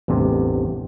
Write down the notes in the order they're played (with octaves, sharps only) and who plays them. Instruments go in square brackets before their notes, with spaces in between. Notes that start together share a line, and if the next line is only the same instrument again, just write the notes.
[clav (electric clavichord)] A1 E2 G2 C3